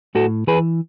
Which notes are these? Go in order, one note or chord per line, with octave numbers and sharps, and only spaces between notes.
A2 F#4 A4
E3 G#4 B4